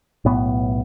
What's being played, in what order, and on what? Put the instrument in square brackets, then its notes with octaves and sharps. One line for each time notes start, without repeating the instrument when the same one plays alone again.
[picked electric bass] B1 A2 B3